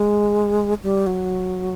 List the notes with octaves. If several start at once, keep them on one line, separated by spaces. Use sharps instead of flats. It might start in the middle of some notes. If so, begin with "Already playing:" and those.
Already playing: G#3
G3
F#3